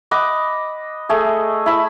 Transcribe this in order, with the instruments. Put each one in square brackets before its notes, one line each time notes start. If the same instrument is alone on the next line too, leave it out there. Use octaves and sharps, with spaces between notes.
[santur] D#5 F#5 B5 D6
A3 G#4
E4 B5 E6